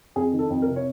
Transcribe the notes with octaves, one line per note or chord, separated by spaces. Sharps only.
F2 G#4
D#3
A4
F2
A#4
C3
C#5